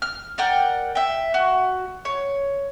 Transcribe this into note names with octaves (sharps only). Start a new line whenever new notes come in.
F6
A#4 D5 F#5 G5
E5 G5
F#4
C#5